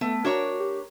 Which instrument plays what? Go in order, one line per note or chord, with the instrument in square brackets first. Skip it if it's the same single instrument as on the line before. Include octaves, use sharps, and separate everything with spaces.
[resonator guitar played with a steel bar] A3 [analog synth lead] B3
[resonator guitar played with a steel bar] D4 A#4 C#5 [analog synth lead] F#4
[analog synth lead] G4